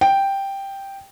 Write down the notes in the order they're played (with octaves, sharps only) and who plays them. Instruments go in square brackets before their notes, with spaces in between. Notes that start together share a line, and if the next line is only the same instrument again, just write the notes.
[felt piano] G5